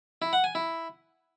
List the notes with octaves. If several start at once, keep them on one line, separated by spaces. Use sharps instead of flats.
E4
F#5
G#5
E4